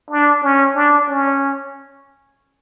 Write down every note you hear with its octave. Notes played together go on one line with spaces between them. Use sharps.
D4
C#4
D4
C#4